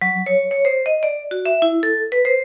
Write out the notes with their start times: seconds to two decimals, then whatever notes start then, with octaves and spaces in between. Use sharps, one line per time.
0.01 F#3
0.26 C#5
0.51 C#5
0.65 C5
0.86 D#5
1.03 D5
1.31 F#4
1.46 E5
1.62 E4
1.83 A4
2.12 B4
2.25 C5